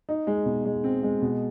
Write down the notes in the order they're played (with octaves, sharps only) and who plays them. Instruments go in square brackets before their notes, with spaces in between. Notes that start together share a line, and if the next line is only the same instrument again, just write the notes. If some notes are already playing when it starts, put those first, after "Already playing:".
[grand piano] D#4
G#3
B2
G#3
C4
G#3
B2